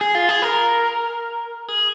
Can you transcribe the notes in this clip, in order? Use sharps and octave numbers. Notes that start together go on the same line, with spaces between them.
G#4
F4
G#4
A#4
G#4